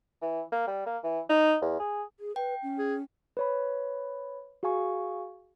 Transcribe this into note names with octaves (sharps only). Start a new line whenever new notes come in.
E3
A#3
G3
A#3
E3
D#4
E2
G#4
G#4
B4 G5
C#4
G#4
B4 C#5 B5
F#4 G#4 F5 G#5 C#6